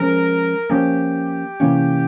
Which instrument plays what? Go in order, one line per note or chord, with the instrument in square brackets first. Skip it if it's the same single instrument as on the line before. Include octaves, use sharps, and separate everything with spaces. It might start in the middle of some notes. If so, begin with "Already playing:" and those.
Already playing: [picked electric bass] F3 G#3 C#4 [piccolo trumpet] A#4
[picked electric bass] F3 A#3 C#4 [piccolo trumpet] G4
[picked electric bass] C3 E3 A#3 C#4